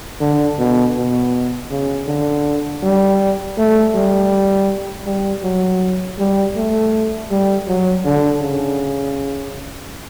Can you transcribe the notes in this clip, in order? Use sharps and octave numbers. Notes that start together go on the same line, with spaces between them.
D3
B2
B2
C#3
D3
G3
A3
G3
G3
F#3
G3
A3
G3
F#3
D3
C#3